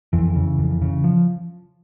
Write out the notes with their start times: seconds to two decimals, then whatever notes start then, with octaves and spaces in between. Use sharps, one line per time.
0.13 F2 E3
0.35 C#3
0.58 F2
0.82 C#3
1.04 F3